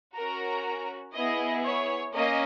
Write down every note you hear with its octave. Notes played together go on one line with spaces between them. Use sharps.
C#4 F#4 A#4 A#5
B3 E4 G#4 D#5
C#5
A#3 C#4 D#5